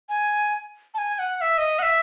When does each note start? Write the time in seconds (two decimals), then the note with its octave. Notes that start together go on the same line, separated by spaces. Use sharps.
0.09 G#5
0.94 A5
0.98 G#5
1.15 G#5
1.19 F#5
1.36 F#5
1.41 E5
1.58 D#5
1.79 F#5
1.82 E5